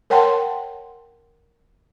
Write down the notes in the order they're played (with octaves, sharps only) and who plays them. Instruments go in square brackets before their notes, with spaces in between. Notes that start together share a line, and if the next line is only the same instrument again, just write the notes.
[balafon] A#4 C#5 F#5 G5 A5 C6